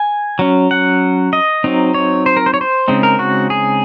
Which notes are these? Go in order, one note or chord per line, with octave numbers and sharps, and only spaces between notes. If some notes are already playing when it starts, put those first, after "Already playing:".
Already playing: G#5
F#3 C#4
F#5
D#5
F#3 C4 D#4
C#5
C5
A#4
C5
C#5
C5
C#3 G#3 C4 D#4
A#4
F#4
G#4